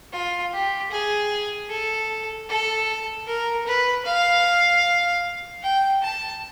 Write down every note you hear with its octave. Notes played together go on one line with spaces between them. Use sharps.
F4
G4
G#4
A4
A4
A#4
B4
F5
G5
A5